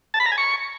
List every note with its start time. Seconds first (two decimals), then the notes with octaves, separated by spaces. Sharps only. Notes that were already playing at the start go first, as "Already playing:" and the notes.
0.14 A5
0.20 B5
0.26 A#5
0.32 G#5
0.38 C#6